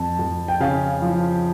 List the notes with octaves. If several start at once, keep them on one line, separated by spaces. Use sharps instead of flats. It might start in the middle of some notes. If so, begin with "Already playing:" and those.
Already playing: F2 A5
F2
G5
C#3 F5
F3